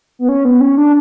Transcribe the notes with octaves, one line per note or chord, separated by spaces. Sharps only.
B3
C#4
B3
C#4
D4